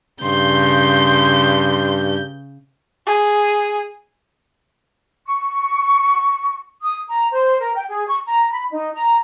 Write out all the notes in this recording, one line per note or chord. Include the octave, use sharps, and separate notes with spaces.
G2 C#3 C6 G6
G#4
C#6
D#6
A#5
C5
A#4
G5
G#4
C#6
A#5
B5
D#4
A#5